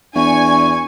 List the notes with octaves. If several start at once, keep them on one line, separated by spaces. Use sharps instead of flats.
E2 D4 G#5 C#6